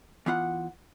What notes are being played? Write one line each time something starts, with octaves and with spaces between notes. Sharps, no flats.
E3 B3 F4 F#5